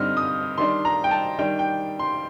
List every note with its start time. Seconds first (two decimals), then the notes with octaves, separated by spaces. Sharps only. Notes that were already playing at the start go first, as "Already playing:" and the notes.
Already playing: G2 D3 G3 C4 D#4 F6
0.17 D#6
0.58 D#3 G3 D4 C6
0.85 A#5
1.04 G5
1.11 A5
1.38 D#3 G3 D4 G5
1.59 G5
1.99 C6